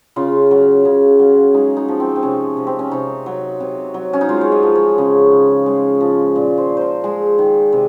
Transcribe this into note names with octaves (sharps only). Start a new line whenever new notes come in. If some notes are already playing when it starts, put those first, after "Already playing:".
C#3 F4
F#3
C#3
F#3
G#3 D#4
D#4
F3
C4
C4
C3 C#4
C3
C4
C#4
C3 D#4
F#3
C3
F#3
C#4
D#4
G#3 F4
C#5
D#5
F3
C#5
C#3
C#3
G#3
F3
A#2
C5
A#2
A#4 C5
G#3 G#4
D#3
C3